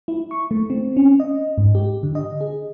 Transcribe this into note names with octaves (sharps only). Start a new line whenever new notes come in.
E4
C#6
A3
C4
C#4
D#5
G#2
G4
D3
D#5
G#4